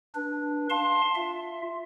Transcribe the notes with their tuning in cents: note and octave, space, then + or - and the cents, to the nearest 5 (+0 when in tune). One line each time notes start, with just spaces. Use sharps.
D4 +0 B4 -20
F5 +5 A5 +0 C6 +20
F4 +0 E5 +15